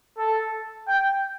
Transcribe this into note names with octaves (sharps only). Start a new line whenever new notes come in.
A4
G5